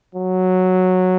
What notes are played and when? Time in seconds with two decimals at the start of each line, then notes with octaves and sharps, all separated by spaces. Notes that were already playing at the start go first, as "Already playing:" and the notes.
0.15 F#3